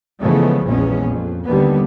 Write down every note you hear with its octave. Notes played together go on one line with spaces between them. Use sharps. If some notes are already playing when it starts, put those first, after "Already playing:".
C#3 E3 F3 G#3 A3 B3
A#1 E2 A#2 G#3 B3 C#4
F2
D#2 D3 G3 B3